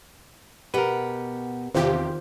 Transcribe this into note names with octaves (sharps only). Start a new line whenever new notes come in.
B2 G4 A#4 B4 F#5
E2 C3 D#3 F4 G4 C5